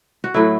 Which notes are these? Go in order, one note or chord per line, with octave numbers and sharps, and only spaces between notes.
F#4
A2 F#3 A3 E4